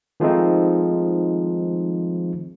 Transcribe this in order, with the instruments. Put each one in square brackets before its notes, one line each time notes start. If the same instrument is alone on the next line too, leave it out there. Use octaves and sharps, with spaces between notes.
[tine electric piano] D#3 F3 G#3 A3 C4 D#4